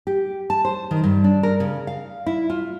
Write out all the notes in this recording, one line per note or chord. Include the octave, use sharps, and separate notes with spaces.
G4
A5
C5
D#3
G2
D4
A#4
C#3
F5
E4
F4